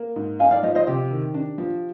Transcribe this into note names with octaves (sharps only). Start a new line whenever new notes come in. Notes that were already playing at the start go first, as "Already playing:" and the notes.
Already playing: A#3
G#2
D#4 F5 G#5
D5 F5
F3 C5 D#5
C5 D#5
C3 G4
D#3
D4
F3